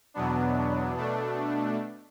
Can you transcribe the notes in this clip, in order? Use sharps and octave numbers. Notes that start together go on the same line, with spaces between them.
E2 B2 F#3 B3 D4
B2 A3 D4